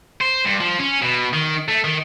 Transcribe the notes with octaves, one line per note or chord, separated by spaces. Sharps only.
C5
G2
F3
C#4
B2
D#3
A3
D#3